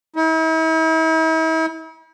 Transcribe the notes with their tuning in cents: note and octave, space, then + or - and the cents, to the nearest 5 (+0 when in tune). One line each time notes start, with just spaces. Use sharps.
E4 -45